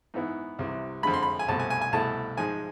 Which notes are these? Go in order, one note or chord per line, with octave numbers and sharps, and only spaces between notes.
G#2 E3 B3 E4
C2 C3 E3
F2 D3 G#3 B5
C6
B5
G#5
C2 B2 A3 C4 A5
G#5
G#5
G#5
C2 B2 A3 E4 A5
G#2 F3 G#3 G#5